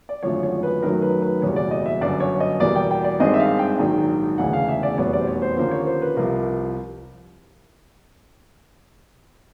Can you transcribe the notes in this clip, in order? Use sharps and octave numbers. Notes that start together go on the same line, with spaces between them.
D5
G#1 F#2 D3 F3 A3 C#5
C#5
B4
F#2 D#3 F#3 A3 A#4
B4
B4
F#1 E2 B2 G3 C#5
D5
D#5
E5
G1 F#2 D3 D5
C#5
D#5
E2 B2 G3 A#3 D5
G5
G5
D5
G#1 G2 D#3 G#3 C4 D#5
E5
F5
G5
A#1 G#2 D#3 F#3
E1 D2 C#3 E3 F#5
F5
E5
D5
F1 E2 B2 G3 B3 C#5
D5
C5
C#5
C5
D#2 D3 F3 A#3 C#4 C5
C#5
C5
B4
C2 C3 F3 A#4